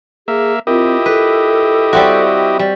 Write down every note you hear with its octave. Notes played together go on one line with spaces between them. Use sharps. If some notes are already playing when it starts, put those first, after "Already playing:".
A#3 G#4 E5
C4 E4 F4 G4 A#4 D#5
A4 B4
G3 C4 F#4 E5 F#5 B5
G3